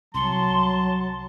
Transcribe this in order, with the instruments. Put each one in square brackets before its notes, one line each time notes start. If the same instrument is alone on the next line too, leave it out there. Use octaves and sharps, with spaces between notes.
[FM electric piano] C2 C#6 [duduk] F#3 [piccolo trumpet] A5 [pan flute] C6